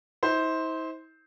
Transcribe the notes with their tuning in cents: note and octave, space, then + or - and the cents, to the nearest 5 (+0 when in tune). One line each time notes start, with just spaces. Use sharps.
E4 -45 C5 +0